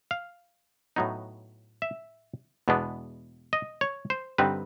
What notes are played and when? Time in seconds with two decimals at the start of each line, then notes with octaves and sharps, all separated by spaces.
0.11 F5
0.96 A2 F#3 B3 D#4
1.82 E5
2.68 E2 B2 G#3 B3 D4
3.53 D#5
3.81 C#5
4.10 C5
4.38 G2 D3 G3 C4 D#4 B4